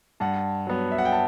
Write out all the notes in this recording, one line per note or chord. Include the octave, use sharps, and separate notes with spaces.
G2 F#5 A5
F#3 B3
E5
F#5
G5
A5